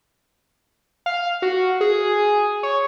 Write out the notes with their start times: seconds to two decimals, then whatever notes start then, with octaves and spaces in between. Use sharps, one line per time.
1.06 F5
1.42 F#4
1.81 G#4
2.63 C#5